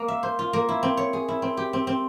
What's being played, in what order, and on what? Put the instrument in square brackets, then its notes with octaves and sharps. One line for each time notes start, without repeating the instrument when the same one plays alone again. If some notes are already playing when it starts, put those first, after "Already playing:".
Already playing: [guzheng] A#3
E5
C5
F4
A#3
E4
C4
C#5
G#4
E4
C4
G4
C4
C4